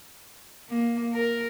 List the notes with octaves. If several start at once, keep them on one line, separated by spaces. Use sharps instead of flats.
A#3
A#4